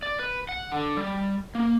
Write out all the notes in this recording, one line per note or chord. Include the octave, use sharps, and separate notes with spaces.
D5
B4
F#5
D3
G3
A#3